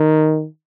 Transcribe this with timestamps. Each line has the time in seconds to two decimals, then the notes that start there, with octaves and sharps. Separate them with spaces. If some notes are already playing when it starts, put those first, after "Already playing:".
Already playing: D#3